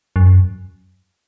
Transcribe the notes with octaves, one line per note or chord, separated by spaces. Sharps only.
F#2